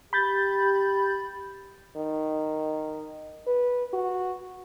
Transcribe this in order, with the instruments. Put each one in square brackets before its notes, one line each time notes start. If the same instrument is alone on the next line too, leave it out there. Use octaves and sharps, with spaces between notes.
[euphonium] G4 [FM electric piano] B5 G6 A6
[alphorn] D#3
B4
F#4